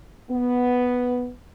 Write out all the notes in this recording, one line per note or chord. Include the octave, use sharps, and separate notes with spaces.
B3